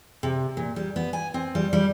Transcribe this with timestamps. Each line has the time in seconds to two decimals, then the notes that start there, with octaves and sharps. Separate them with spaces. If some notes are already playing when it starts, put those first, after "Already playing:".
0.23 C3
0.57 A#2
0.76 G3
0.96 B3
1.13 G#5
1.34 C4
1.55 G3
1.73 G3